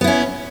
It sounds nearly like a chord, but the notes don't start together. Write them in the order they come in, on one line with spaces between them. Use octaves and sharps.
B3 E4 C#4